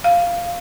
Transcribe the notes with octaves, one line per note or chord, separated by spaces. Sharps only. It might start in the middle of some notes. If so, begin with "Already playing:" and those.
F5